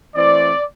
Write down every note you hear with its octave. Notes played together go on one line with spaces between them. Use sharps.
E3 A3 C4 D5